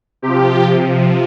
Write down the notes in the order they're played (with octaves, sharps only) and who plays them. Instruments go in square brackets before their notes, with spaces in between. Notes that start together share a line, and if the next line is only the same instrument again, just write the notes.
[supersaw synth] C3 F3 G4